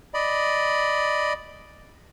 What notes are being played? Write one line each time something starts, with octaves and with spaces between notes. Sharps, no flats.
D5 D#5 B5